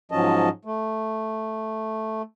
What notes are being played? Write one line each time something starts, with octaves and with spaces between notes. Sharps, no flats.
G#2 F3 F#3 C#4 D#5 A5
A3